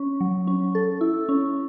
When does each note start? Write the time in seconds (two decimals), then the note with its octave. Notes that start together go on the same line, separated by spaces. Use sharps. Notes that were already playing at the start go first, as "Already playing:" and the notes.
Already playing: C#4
0.21 F#3
0.47 C#4
0.75 A4
1.01 E4
1.29 C#4